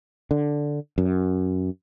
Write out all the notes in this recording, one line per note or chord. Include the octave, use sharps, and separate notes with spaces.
D3
F#2